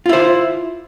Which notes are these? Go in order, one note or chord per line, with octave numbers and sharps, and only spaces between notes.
E4 F4 C5